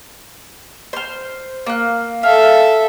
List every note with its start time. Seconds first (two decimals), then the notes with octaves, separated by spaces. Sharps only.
0.93 C5 F6
1.66 A#3 F#6
2.23 A4 E5 F5